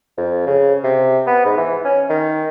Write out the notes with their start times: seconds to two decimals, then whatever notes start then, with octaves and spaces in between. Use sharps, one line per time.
0.17 F2
0.46 C#3
0.84 C3
1.27 B3
1.45 G#2
1.57 E3
1.85 C#4
2.09 D#3